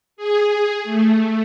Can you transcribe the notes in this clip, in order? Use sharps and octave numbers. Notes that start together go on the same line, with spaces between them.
G#4
A3